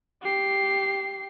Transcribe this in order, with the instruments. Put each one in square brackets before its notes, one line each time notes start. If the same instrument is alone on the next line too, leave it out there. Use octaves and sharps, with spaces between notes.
[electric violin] G4 C7